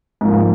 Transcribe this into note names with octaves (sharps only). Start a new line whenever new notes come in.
G#2 F3 A#3